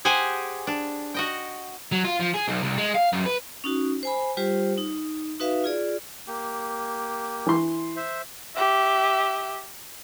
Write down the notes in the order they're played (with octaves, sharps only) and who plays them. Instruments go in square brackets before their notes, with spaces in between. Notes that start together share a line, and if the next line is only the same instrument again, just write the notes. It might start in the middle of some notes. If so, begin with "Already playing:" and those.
[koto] G4 G#4 C5 F#5 G#5
D4
F#4 D#5 G5
[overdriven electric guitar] F#3
F4
F3
G#4
B1
C2
G#3
F5
F#2
B4
[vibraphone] C#4 D#4 F#4
C5 G#5 B5
G3 F4 G4 C5
D#4
D#4 F#4 B4 E5 F5
F4 G#4 D5
[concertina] A#3 G4
[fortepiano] E3 C6
[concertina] C5 E5
[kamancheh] G4 E5